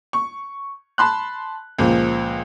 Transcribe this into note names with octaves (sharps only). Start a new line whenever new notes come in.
C#6
A5 B5 C6 F#6
C#2 A#2 F3